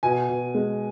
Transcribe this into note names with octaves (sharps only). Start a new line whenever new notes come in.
B2 G#5
B2
G#3